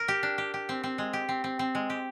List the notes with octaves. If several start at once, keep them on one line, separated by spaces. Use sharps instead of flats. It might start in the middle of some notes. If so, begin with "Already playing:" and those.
Already playing: A#4
G4
D4
G4
G4
C4
C4
G#3
G4
C4
C4
C4
G#3
G4